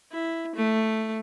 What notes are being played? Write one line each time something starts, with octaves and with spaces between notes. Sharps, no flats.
E4
A3